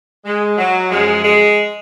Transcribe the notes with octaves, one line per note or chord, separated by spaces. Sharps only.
G#3
F#3
F#2 F3 G#3
G#3